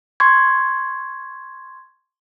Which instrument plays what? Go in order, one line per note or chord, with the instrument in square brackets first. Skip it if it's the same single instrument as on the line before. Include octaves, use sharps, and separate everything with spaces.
[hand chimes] C6 C#6 G#6